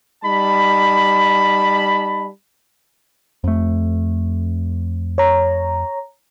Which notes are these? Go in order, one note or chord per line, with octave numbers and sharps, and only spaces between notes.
G3 D#4 A5 B5
F2 A3
C#5 A#5